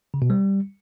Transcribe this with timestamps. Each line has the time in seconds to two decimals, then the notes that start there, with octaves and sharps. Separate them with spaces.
0.14 C#3
0.22 B2
0.30 G3